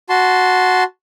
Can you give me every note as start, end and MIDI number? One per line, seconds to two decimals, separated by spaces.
0.09 0.84 66
0.09 0.84 81
0.09 0.84 84